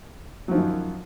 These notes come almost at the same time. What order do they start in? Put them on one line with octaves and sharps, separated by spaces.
F#3 F3 D#3 F#2